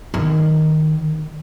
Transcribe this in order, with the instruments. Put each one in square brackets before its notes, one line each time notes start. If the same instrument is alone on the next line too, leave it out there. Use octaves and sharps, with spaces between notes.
[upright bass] D#3